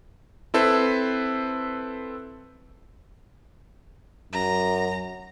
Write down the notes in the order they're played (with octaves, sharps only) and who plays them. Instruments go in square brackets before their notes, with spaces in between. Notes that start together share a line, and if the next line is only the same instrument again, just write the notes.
[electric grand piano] C4 E4 A4 B4 C5
[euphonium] F#2 [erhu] A#5